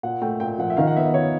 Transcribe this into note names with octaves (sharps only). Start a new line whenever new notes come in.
A#2 F#5
A3 G5
A#2 G5
F3 F#5
E5
D#3 F5
F#5
D#5
B3 E5
D#5
D#3 C#5